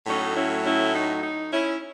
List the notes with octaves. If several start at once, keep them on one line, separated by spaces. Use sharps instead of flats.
A2 F#3 A3 C#4 D#4
C#4 E4
C#4 E4
D#4
D#4
C#4 E4